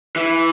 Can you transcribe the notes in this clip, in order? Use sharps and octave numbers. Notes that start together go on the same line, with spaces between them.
E3